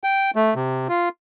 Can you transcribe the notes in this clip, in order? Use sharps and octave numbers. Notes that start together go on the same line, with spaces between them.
G5
A3
C3
F4